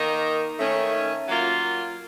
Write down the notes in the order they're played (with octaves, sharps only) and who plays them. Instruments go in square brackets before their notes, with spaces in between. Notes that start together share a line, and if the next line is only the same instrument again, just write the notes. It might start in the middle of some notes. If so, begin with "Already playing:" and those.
Already playing: [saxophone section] D#3 A#3 D#4 A#4 D#5
D#3 A3 C#4
F#3 A#3 F4